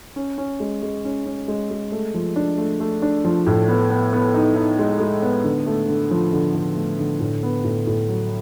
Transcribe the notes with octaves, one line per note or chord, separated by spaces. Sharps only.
C#4
C#4
G#3
G#3
C#4
C#4
G#3
G#3
A3
F3
D4
A3
A3
D4
F3
A2
B3
B3
B3
D#4
D#4
G#3
G#3
B3
D3
A3
D3
F3
D3
D3
A3
D3
A2
B3
A2
A2
F#3